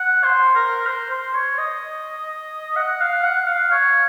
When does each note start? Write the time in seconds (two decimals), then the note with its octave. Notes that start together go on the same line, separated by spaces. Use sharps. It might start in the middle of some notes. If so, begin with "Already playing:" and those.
Already playing: F#5
0.24 C5
0.55 A#4
0.86 C5
1.10 C5
1.35 C#5
1.58 D#5
2.76 F#5
3.00 F5
3.24 F#5
3.47 F5
3.71 C#5